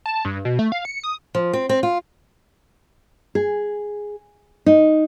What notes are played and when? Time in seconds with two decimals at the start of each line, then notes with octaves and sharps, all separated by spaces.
0.06 A5
0.25 G2
0.45 B2
0.59 A3
0.72 F5
0.85 C#7
1.03 D#6
1.35 F3
1.53 C4
1.69 C4
1.83 F4
3.35 G#4
4.66 D#4